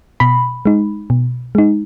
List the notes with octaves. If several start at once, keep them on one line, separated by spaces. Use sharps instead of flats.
B2 B5
G#3 D#4
B2
G#3 D#4